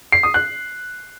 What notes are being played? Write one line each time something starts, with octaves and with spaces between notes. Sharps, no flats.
C7
D#6
F#6